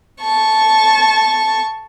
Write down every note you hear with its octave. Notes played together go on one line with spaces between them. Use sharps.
A5 C#6